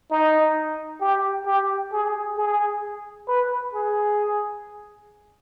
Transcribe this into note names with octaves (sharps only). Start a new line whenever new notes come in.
D#4
G4
G4
G#4
G#4
B4
G#4